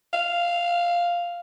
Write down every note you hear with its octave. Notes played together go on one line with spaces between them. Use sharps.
F5